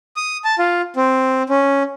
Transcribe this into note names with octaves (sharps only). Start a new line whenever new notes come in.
D#6
A5
F4
C4
C#4